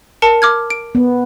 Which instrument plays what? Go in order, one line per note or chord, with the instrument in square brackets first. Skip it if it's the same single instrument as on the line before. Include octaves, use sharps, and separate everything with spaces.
[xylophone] A#4 A5 C#7
D6 F6 G#6
D7
[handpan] B3